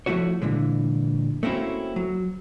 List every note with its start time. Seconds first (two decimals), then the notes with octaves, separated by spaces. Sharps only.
0.06 F3 A3 E4 F#4 C#5
0.42 A#2 D3 E3 G#3
1.43 A3 A#3 C4 C#4 E4 F#4
1.96 F#3